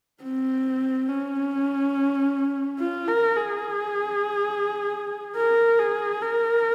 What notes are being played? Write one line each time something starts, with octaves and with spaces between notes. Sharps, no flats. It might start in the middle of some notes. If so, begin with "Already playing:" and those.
C4
C#4
F4
A#4
G#4
A#4
G#4
A#4